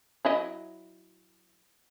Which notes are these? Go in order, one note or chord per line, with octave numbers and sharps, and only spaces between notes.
F#3 E4 D#5